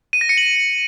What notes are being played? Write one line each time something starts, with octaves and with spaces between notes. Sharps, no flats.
D#7
A#6
C#7
F#7